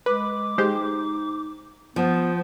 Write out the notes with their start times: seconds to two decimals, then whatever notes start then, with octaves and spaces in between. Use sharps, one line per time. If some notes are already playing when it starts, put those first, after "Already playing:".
0.06 G#3 B4 D6
0.58 G#3 D#4 G4 C5
1.96 F3 B3 C5